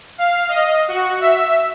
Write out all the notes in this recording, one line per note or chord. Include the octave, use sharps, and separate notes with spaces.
F5
D#5
F#4
E5